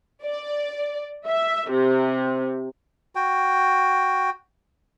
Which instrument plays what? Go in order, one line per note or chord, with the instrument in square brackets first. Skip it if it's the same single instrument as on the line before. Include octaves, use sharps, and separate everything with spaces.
[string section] D5
E5
C3
[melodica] F#4 G5